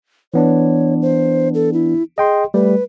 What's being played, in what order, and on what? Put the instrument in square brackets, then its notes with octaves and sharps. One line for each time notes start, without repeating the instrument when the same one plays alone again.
[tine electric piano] E3 B3 D4 [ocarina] C#5
[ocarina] C5
A4
E4
[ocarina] G#4 [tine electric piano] D#5 G5 C6
[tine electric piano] G3 A3 [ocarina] B4